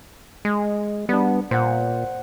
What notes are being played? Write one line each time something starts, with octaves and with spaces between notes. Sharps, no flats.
G#3
G3 B3 D4
A#2 C5 F#5